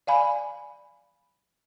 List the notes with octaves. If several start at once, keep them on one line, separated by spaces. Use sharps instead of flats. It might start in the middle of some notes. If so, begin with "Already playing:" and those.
D5 F5 G#5 B5